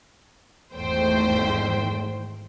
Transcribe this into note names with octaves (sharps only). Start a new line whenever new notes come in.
G#1 E2 G#2 A3 C5 G5